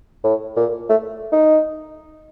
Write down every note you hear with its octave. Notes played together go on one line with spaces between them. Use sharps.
A2
A#2
A3
D#4